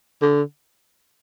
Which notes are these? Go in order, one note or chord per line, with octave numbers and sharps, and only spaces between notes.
D3